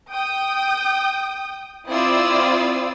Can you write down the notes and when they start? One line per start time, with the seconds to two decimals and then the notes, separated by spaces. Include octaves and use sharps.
0.10 G5 D#6
1.88 C4 E4 F4 D5 D#6 E6